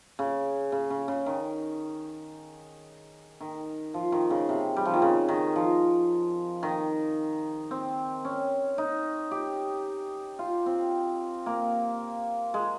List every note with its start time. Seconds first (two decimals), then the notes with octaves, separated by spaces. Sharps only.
0.19 C#3
0.72 C#3
0.90 C#3
1.08 C#3
1.26 D#3
3.40 D#3
3.94 F3
4.12 D#3
4.30 C#3
4.49 C3
4.76 G3
4.85 F3
4.94 D#3
5.02 C#3
5.28 D#3
5.56 F3
6.63 D#3
7.71 C4
8.25 C#4
8.78 D#4
9.31 G4
10.39 F4
10.66 C4
11.46 A#3
12.54 G#3